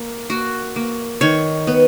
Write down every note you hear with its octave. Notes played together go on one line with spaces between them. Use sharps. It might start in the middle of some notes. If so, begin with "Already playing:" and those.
Already playing: A#3
A#3 F#4
A#3
D#3 C#5
B3